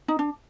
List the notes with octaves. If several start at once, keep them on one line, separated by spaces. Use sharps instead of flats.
D#4
D4